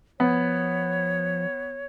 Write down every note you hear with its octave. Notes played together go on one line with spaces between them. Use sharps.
F3 B3 C#5